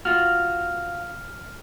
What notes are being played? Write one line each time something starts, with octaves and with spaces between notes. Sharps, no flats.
F4 F#4 F6